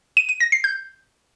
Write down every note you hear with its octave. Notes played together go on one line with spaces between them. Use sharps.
D#7
D#7
A#6
C7
G6